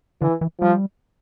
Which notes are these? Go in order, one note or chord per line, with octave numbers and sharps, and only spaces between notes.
D3 E3
E3
F3 G3